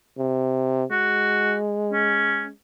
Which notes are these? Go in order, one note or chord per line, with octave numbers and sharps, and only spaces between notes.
C3
G#3 F#4
C#4